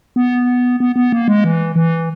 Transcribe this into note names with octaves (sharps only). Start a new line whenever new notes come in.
B3
B3
B3
A#3
G#3
E3
E3